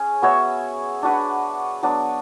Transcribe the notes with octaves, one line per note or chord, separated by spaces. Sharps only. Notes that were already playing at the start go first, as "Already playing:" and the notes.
Already playing: C#4 G#4
B3 F#4 C#5 E5
D4 F#4 B4
F#3 B3 D4